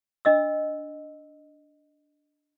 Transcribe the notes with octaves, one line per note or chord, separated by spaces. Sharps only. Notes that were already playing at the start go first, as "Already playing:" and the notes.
D4 D#5 E6